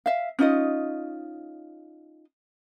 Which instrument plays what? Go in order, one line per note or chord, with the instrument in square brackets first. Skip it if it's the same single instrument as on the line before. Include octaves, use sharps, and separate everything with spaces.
[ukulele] E5 F5
C#4 D#4 F4 D#5